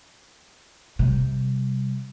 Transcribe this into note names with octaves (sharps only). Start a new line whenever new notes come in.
C3 G3